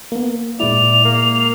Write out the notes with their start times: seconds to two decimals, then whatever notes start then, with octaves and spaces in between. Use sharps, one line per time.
0.12 A#3 B3
0.60 A#2 G#3 E4 D5 F7
1.04 A#3